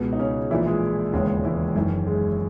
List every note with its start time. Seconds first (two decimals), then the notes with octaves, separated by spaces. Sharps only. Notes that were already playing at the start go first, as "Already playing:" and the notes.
Already playing: C#2 B2 B3
0.13 D#4
0.19 C#3 C#4
0.51 A#1 A#2 E3 E4
0.66 G#3 G#4
1.13 E1 D#2 C#3 E3 G#3 G#4
1.44 E3 E4
1.75 F#1 F#2 D#3 E3 E4
2.06 G#3 G#4